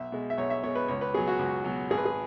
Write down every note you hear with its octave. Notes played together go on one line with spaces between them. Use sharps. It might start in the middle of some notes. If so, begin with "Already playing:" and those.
Already playing: B1 E5
B2 G#3
E5
B1 C#5
E5
B2 G#3 C#5
B4
C#2 C#5
B4
B2 F#3 G#4
F#4
C#2
B2 F#3
G#1 G#4
B4
G#4